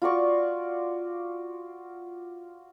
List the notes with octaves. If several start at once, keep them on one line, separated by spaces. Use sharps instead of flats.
F4 F#4 D5 C#6